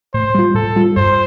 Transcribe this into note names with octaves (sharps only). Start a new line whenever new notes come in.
A2 C5
G3 F4
A2 A4
G3 F4
G2 C5